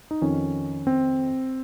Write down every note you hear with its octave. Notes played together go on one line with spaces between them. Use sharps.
D#4
F2 D#3 C#4
C4